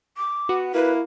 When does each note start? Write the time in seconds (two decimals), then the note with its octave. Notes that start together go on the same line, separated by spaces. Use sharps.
0.17 D6
0.49 B3 F#4
0.74 A#3 E4 B4